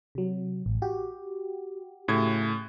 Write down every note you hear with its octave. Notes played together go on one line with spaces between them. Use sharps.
C3 F#3
A1
F#4 G4
A2 C#3 G#6